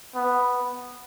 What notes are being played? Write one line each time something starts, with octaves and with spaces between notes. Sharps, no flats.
B3